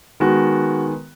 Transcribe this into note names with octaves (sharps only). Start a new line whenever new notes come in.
D#3 G#3 B3 F#4